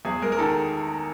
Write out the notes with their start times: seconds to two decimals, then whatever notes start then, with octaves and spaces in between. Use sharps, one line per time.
0.05 E2 G#4
0.22 G#3 A#4
0.32 A#4
0.38 D#3 A4